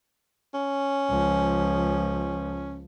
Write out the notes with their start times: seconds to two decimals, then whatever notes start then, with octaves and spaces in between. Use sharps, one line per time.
0.54 C#4
1.09 C#2 F3